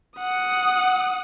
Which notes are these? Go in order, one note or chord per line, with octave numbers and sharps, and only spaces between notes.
F#5 D#6